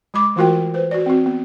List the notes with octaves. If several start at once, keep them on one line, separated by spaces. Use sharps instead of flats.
G#3 B5 D6
E3 A3 F4 F#4 A#4 G5
B4 C5
F#4 D5
C4 F#4
B3